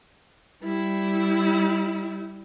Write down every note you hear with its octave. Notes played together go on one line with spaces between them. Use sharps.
G3 E4